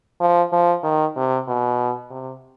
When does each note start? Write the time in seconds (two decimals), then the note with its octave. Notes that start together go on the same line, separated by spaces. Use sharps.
0.20 F3
0.52 F3
0.84 D#3
1.16 C3
1.48 B2
2.10 C3